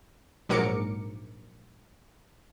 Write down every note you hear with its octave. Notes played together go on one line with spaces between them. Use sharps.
A#1 G#2 F#3 A#4 D6 C#7